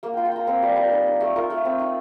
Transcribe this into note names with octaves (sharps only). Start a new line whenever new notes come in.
A#3 F5
F4 G5
G5
F4 A#5
C4 C5
G3
G3
D#4
D#4
A3
F4 A#4
A3
C4
D#4